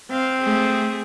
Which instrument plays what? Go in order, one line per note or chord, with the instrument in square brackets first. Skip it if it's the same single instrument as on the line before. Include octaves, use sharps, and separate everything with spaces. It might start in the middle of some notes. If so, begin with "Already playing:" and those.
[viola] C4 [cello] F5
[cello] A3 G#4